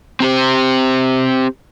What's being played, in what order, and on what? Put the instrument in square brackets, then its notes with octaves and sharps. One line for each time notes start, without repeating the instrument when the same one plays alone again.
[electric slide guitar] C4 G4 C5